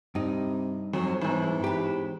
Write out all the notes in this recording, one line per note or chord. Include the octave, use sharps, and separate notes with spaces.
G2 C3 D#4
F2 F#3
E2 G#2 E3
G4 B4